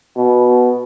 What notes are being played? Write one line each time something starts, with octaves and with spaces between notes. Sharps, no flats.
B2